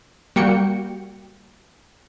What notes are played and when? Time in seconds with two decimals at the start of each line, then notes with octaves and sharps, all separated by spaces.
0.36 G3 A#3 F#4 G5 C#7